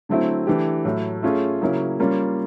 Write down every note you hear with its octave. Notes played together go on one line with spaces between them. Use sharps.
D3 F#3 A3 C4 E4
E3 A3 D4 G4
A2 F#3 A3
A3 C#4 F4 G#4 C#5
C#3 F#3 A#3 C#4 E4
G3 A#3 C#4 F4